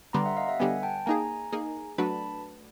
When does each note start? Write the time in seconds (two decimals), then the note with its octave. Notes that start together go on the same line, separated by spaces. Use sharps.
0.13 D3 G3 B3 A#5 C6
0.26 E5 F#5
0.37 D#5 F5
0.49 E5 F#5
0.59 D3 G3 B3 F#5 G#5
0.83 G5 A5
1.06 A#3 D#4 G#4 G#5 A#5
1.52 A#3 D#4 G#4
1.98 F#3 A3 D4 F#4 B4 A5 B5